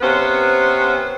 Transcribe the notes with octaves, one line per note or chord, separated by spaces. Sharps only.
C3 B3 C#4 B4 C5